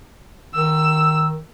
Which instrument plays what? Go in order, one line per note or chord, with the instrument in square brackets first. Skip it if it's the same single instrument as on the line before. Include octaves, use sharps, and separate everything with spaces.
[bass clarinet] D#3 [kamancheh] E6